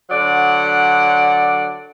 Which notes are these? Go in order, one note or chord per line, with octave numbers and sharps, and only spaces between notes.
D3 F#3 D5 F#5